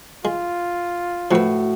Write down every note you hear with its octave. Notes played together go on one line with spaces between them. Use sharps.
G#3 F4
A2 F3 F#4 B4